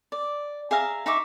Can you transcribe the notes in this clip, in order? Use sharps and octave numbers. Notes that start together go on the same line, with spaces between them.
D5
G#4 E5 F5 A#5
D#4 E5 C#6 D6